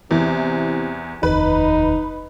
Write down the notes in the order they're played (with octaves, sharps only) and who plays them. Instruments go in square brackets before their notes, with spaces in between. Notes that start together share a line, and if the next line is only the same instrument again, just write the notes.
[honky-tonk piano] E2 E3 [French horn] C3
[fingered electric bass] F1 D#2 [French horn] D#4 [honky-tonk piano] B4